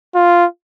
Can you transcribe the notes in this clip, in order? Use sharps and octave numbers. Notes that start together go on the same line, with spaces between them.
F4